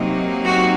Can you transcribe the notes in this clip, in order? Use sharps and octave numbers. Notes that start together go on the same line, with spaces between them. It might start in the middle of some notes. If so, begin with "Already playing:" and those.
Already playing: C3 F#3 A#3 D#4
F#4